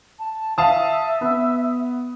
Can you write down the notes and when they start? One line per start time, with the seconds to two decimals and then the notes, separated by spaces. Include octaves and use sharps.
0.19 A5
0.58 E5 F5 A5 D#6
1.21 B3